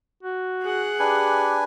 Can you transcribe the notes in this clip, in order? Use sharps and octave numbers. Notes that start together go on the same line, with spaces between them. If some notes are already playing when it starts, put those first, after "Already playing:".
F#4
G#4 F#5
D4 G4 B4 G#5